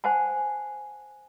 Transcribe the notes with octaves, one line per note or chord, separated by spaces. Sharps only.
C5 F#5 G#5 A5